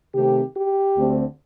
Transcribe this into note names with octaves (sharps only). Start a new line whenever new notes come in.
C3 D#3 A3 C4 G4
G4
D2 D3 A3 C4